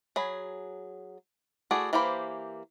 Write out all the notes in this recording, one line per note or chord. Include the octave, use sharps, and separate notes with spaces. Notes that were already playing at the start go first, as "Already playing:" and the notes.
F#3 G#4 B5
A3 E4 F#4 G#4 D5
E3 A#3 G4 C5 B5